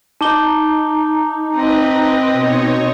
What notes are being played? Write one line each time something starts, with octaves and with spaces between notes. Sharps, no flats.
D#4 A5 D6 G7
C4 B4 D#5
B2 D#4 C#5